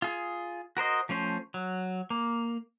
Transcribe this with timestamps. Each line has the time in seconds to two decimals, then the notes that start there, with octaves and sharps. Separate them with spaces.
0.02 F4 G#4
0.77 F#4 A#4 C5 D#5
1.09 F3 A3 C#4 C5
1.54 F#3
2.10 A#3